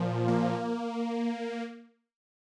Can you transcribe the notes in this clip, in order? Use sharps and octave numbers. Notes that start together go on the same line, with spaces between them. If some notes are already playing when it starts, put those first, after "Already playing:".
Already playing: A#2 F3
A#3